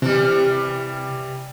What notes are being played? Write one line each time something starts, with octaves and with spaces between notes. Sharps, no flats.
C3 E3 G3